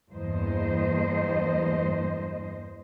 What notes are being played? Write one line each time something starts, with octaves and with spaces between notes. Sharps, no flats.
E2 G2 A#3 C5 D#5